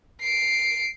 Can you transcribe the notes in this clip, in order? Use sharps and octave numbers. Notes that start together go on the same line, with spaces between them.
C7 D7